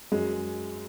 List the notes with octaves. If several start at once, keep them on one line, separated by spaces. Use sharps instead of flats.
F#2 G#3